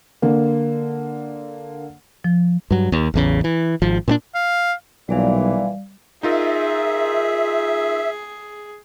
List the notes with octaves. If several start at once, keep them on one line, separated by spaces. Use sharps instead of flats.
D3 A#3
F3
G2 F#3
D#2
A1 E2 C#3
E3
G#1 F3
A#2 B3 D4
F5
B1 A#2 E3 G3 D5 F5
D#4 F4 G#4 A#4 E5